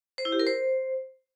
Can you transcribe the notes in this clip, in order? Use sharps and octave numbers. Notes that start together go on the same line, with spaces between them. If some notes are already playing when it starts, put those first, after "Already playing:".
C5
E4
G4
A#4
C5